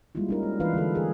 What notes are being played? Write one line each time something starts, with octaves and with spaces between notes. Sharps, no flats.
G3 G#3 A#3 E4 F4
C#4 D#4 A#4
G#3
E3 D4 E4 F4 B4 F5
D3 G#3 F#4 A4
G#4 A#4